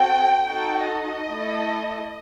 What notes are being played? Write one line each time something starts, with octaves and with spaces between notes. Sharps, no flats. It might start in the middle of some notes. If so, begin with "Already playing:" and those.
Already playing: C4 F#4 A4 G5
D#4 F#4 A4 G5
D#5
A3 E4 A4